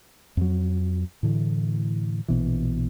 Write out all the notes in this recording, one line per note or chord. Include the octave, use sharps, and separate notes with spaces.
F2 F#3
A2 D3 E3
A#1 B2 E3